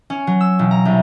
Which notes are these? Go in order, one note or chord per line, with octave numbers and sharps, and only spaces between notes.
C#4
F#3
E6
E1
A#5
C2